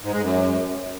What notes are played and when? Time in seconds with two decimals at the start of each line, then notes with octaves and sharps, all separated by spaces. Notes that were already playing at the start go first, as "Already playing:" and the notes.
0.03 G#2
0.13 G#3
0.23 F#2